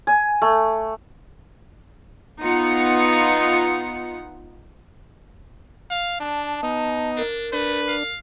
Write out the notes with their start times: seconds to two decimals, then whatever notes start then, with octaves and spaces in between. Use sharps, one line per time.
0.07 G#5
0.42 A3
2.40 B3 D#4 F4 F#5 C#7
5.91 F5
6.20 D4 A5
6.63 B3 D#4 D#5
7.17 D4 A#4
7.53 A3 D4 B4
7.88 F5